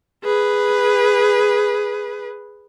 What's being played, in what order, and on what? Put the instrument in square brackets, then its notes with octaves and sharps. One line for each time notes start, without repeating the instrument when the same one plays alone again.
[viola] G#4 B4